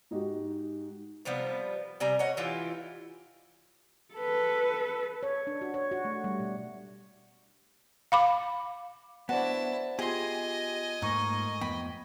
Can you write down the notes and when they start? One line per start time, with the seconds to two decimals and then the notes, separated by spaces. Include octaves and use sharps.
0.11 G#2 D#4 F#4 G4
1.25 C3 F3 G3 B3
2.00 C3 G3 G#5 A#5
2.19 C#5 D#5 F#5
2.37 E3 E4 F4 G4
4.14 A4 B4
5.23 C#5
5.47 D4
5.61 F#4
5.74 C#5
5.92 F#4
6.05 A3
6.24 G3
6.40 B2
8.12 F5 B5 D6
9.29 B3 D4 E4 F#4 C5 D5 A5
9.99 B3 F4 G4 G#4 D#5 G#5 C6
11.02 G#2 A3 A#3 D#4 C#6
11.61 F2 B3 G5 B5